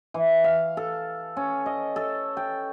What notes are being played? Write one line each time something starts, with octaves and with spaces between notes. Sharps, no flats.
E3
F5
A4
C#4
D#5
A4
G5